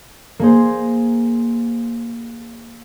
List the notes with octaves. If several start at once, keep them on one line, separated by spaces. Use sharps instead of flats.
A#3 G#4 C5